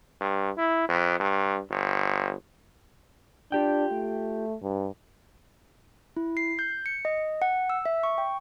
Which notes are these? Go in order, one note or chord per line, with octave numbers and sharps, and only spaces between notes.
G2
E4
F2
G2
G1
D4 F4 G4 G5
A3
G2
E4
C7
G6
C#7
D#5
F#5
E6
E5
C#6
G5